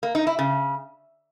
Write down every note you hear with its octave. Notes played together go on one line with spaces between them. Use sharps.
A#3
D#4
E4
C#3